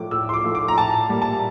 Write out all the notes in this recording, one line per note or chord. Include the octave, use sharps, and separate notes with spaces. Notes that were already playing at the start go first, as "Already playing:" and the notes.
Already playing: A2 F3 A3 D6
A2 E6
C6
D6
F3 A3
D6
A#5
A2 A5
G3 A#3
A5